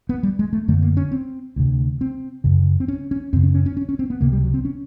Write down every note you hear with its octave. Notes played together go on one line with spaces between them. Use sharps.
B3
G3
G#3
A3
F#2 D3 A3
A#3
C#4
C4
D2 C3
C4
F#2 C#3
C4
C#4
C#4
F#2 C#3 C4
C#4
C#4
C#4
C#4
C#4
C4
B3
C#2 C3 A#3
G3
F#3
C4
C#4